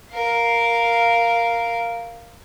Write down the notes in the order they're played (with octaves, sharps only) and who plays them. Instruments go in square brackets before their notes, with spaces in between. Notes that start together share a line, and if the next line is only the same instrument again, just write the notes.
[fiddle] A#4 F5